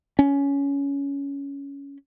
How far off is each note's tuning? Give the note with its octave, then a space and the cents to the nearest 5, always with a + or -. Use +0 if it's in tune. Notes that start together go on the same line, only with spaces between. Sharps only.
C#4 +15